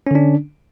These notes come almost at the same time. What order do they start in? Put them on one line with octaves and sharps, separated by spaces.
C#4 D3 D4